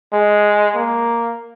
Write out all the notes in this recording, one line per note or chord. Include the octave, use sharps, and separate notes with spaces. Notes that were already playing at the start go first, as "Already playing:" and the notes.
G#3
A#3